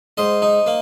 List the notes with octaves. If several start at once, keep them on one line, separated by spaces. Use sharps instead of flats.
G#2 C5 D#5
D#4
A#3